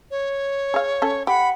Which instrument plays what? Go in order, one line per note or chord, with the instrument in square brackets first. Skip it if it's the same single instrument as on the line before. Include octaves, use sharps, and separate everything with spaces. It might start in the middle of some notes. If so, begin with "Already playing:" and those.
[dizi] C#5
[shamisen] G#4 F5
C#4 A4
[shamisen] G4 [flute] F#5 [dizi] B5